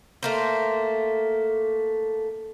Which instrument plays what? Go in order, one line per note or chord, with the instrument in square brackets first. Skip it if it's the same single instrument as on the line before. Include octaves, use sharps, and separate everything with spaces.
[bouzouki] A3 A#3 C5